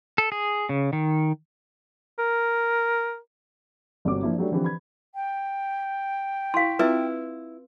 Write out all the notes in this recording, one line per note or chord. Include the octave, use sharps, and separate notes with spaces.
A4
G#4
C#3
D#3
A#4
G1 C3 C#4 F#4 D6
F3 A#3 D4 E4
F#3 G3 A3 D4
D3 E3 F3 C4 G4 B4
B5 G#6
G5
E4 F5 C6
C4 E4 F4 B4